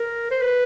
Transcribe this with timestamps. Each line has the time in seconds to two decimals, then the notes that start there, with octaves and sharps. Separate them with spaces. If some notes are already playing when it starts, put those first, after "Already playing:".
Already playing: A#4
0.31 C5
0.42 B4